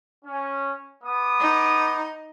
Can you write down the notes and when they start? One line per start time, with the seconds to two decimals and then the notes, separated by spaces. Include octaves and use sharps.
0.25 C#4
1.03 B3 D6 D#6
1.40 D#4